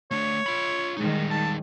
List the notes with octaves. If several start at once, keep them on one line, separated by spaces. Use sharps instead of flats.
A3 D4 C#5
F4 B5
D#3 G3 G#3 D#4
A5